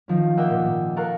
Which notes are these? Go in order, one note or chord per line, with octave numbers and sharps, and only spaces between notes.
D#3 F3 C#4
A#3 D#5 E5 F#5 G5
A#2
A#2
A4 A#4 F5 A#5 C#6 F#6